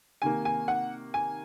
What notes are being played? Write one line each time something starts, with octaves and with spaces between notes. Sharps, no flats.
C3 D#3 A#3 G#5
G#5
F#5
G#5